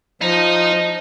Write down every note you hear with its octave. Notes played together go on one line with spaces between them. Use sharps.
F3 D#5 A#5